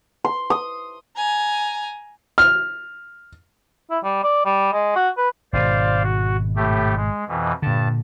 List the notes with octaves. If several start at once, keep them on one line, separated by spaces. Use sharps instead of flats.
C6
D#6
G#5 A#5
F6
E4
G3
D5
G3
G#3
F#4
B4
G#1 B2 D#3 C5 D5 F5
F#4
A2 A3 G4
G#3
F2 B2 E3
G2 A#2 D3 A5